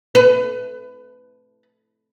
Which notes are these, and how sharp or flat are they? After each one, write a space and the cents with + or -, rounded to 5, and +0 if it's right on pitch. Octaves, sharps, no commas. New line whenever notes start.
B4 +20